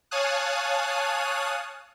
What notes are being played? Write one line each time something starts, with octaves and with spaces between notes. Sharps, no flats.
C#5 F5 G#5 A5 D#6 F#6